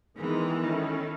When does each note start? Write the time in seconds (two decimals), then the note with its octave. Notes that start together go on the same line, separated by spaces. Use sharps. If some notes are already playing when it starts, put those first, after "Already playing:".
0.17 D#3 E3 G#3 B3
0.63 D#3 C#4 E4 A4